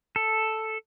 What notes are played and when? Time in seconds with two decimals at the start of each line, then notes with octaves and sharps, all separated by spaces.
0.16 A4